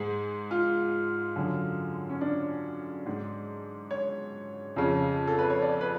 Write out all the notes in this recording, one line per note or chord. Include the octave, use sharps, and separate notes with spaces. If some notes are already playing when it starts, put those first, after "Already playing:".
Already playing: G#2 G#4
F4
F#2 D3
C#4
D4
G#2
C#5
F2 C#3
A4
B4
C#5
D5
B4